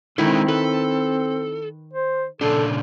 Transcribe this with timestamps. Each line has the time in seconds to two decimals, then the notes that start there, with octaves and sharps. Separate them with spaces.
0.18 D#3 G#3 C4 D4 E4 A4
0.48 A4 B4
1.93 C5
2.41 A#2 C#3 D4 A4 C6